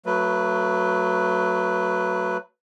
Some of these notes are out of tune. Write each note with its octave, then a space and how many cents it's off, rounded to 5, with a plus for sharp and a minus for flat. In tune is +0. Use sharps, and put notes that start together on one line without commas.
F#3 +0 A3 +30 B4 +0